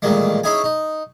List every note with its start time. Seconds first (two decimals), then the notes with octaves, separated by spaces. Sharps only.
0.02 A1 A#2 D#3 G3 G#3
0.44 C#4 D#4 E4 G#4 G#5
0.64 D#4